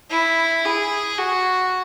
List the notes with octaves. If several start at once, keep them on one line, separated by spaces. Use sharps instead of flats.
E4
G#4
F#4